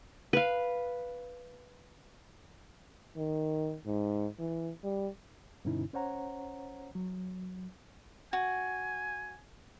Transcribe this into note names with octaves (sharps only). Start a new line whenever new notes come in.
B4 F5
D#3
G#2
E3
G3
G2 B2 D3 C#4 D#4 E4
C#4 C5 C#5 F#5 A#5
F#3
F#4 G#5